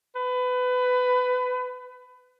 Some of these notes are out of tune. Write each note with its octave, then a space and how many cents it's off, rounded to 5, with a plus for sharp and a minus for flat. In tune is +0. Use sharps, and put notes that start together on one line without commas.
B4 +25